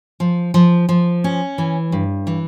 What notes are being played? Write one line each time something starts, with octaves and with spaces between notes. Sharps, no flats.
F3
F3
F3
C#4
E3
G2
E3